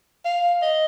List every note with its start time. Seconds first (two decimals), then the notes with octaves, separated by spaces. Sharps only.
0.25 F5
0.62 D#5